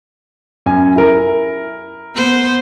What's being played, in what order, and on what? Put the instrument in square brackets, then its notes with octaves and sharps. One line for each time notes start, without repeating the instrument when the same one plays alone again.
[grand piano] F#2 G#5
E4 A#4
[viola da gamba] B3 C5